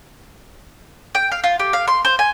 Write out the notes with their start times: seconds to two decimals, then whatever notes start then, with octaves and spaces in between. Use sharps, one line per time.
1.15 G5
1.32 F5
1.44 F4
1.60 G4
1.73 F5
1.88 C6
2.05 C5
2.19 G#5